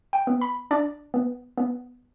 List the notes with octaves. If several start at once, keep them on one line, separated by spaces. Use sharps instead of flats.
G5
B3
B5
D4 D5
B3
B3